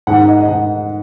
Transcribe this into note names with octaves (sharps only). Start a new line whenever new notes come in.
G#2 D#3 F#5
D#5
D#5
G#2 D#3 F#5